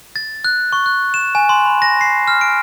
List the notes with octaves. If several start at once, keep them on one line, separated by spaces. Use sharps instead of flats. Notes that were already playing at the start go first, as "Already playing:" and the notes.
A6
F#6
C#6
F#6
E7
G#5
C6
B5
A#6
C7
F6
D7